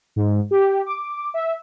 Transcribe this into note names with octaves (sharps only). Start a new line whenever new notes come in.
G#2
G4
D6
E5